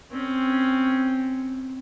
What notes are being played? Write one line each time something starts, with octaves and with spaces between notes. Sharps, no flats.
C4 C#4